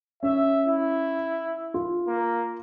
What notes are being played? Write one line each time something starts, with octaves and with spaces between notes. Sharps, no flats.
C#4 E5
E4
F4
A#3